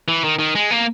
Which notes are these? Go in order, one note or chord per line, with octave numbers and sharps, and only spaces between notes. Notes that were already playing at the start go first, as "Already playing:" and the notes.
E3
D#3
D#3
G#3
A#3